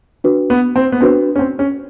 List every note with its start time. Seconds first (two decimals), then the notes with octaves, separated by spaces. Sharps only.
0.24 D4 F#4 B4
0.50 B3
0.76 C4
0.92 B3
1.01 C4 D4 F#4 B4
1.36 C#4
1.39 C4
1.59 C#4